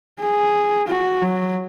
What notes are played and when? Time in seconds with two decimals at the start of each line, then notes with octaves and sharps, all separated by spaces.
0.20 G#4
0.88 F#4
1.22 F#3